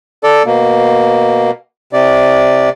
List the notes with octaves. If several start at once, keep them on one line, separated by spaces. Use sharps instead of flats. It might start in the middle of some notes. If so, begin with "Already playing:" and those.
A4 D5
B2 A#3
C3 D5